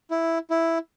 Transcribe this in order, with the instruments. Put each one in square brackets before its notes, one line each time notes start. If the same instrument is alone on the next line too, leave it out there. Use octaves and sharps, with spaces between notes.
[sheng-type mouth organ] E4
E4